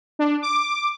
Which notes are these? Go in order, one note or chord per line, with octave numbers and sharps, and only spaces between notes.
D4
D6